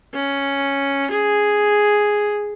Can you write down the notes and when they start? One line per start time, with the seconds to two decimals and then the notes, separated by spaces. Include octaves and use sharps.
0.14 C#4
1.11 G#4